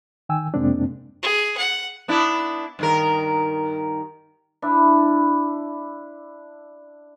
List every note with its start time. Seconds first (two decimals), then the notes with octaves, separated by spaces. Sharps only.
0.29 D#3 G5 G#5 E6
0.54 F2 C3 G#3 A#3 C4 D4
1.23 G#4
1.57 F#5
2.08 B3 D4 E4
2.79 G2 D#3 A#4
4.62 D4 E4